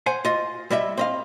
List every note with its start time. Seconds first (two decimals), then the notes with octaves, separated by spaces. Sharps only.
0.06 C5 F#5 G#5
0.25 F4 D#5
0.70 G3 E4 D#5 E5
0.97 C4 D#5 F5